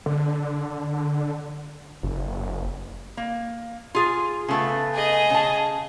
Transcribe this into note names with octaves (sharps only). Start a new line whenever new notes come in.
D3
F#1
A#3
F4 G#4 G#5
C#3 A3 B3
G#4 D#5
C#3 A5